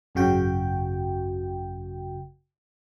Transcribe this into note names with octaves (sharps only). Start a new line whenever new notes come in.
G#1 F#2 C#3 F#4 G5